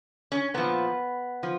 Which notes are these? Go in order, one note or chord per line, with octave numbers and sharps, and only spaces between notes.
C#4
A#2 F3 B3
F3